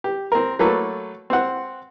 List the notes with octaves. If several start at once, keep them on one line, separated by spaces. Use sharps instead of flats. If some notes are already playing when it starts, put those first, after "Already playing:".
G4
C4 A#4
F#3 A3 A#3 A4 B4
C4 F#5